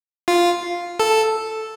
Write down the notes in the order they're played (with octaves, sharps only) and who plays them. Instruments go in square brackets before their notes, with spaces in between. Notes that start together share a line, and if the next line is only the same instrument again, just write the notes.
[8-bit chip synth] F4
A4